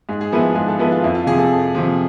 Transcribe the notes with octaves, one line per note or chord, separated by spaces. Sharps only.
G#2 G#4
G#4
F3 B3 E4 G#4 B4
F4
G#2 G#4
A4
F3 B3 E4 G#4 B4
F4
F2 E4
F4
C3 F3 G#4
A4
F2
C3 F3